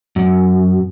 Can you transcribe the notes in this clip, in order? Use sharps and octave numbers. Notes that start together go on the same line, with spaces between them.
F#2